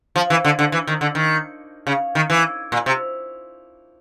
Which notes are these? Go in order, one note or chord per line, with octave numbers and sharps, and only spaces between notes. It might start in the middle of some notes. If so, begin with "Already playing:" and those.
F3
E3
D3
D3
E3
D#3
D3
D#3
C#3
D#3
E3
A#2
C3